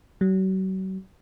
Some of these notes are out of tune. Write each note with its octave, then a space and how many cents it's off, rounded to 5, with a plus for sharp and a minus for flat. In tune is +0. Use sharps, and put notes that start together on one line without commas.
F#3 +40